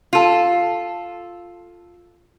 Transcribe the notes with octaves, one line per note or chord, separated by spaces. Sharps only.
F4 A4